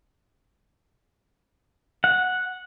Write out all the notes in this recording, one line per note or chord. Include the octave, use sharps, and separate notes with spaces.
F#5